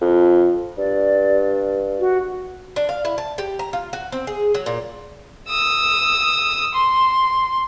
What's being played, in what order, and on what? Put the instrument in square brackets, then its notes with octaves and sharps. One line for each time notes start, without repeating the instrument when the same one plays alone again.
[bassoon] F2
[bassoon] G2 [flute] D5
[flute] F#4
[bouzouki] D4
F5
E4
A5
G4
A#5
F4
F#4
C4
G#4
F#3
A#2
[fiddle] D#6 E6
C6